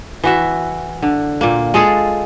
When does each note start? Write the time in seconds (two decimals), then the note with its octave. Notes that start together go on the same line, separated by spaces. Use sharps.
0.24 E3 F#4 E5
1.03 D3
1.41 A#2 A#3
1.74 G#3 F4 G#4 A4